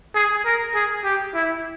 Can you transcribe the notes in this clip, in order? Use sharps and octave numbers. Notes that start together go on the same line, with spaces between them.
G#4
A#4
G#4
G4
E4